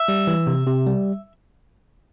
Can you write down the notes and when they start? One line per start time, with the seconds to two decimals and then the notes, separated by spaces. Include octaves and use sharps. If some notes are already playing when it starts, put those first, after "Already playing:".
Already playing: E5
0.08 G3
0.27 E3
0.47 C3
0.67 C3
0.86 G3